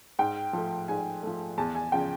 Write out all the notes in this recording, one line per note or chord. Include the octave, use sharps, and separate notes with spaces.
G#2 G5
F3 A3
G#2 G#5
F3 A3
E2 A5
G#5
C#3 F3 G5